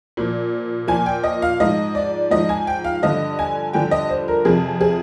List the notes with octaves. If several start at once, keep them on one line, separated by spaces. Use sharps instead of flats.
A#2 F3
A#2 F3 G#5
G5
D#5
F5
G#2 F3 D#5
D5
G#2 F3 D#5
G#5
G5
F5
G2 D3 F3 D#5
G#5
G2 D3 F3 G5
D#5
C5
A#4
F2 C3 F3 G#4
G#4